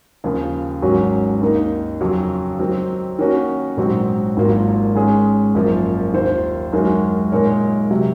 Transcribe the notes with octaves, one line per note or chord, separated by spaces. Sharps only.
D#2 C#3 F3
G#1 G#2 F#3 C#4 F#4
D#2 D#3 A#3 D#4
F2 C#3 F#3
D#3 F#3 C4 D#4
D#3 A#3 C#4 F#4 C#5
A#1 G#2 F#3 C4 F#4
G#1 G#2 F#3 A#3 F4
G#2 D#3 G#3 C#4 G#4
G#1 F#2 F3 A#3 F4
D#2 D#3 A#3 F4 C5
F#2 D#3 G#3 C#4 F#4
A#2 G#3 D#4 A#4 C#5
C3 F#3